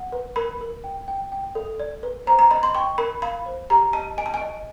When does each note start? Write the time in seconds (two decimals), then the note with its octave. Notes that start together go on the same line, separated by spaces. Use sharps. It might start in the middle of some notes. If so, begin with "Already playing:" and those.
Already playing: F#5
0.12 B4
0.36 A#4 B5
0.61 A#4
0.84 G5
1.08 G5
1.32 G5
1.55 A4
1.80 D5
2.03 B4
2.27 C5 A#5
2.39 A#5
2.51 D#5 B5
2.63 C6
2.75 G5 C#6
2.98 A#4 B5
3.22 F5 B5
3.46 C5
3.70 G4 A#5
3.93 D#5 A5
4.17 D#5 G#5
4.26 A5
4.34 G#5
4.41 D#5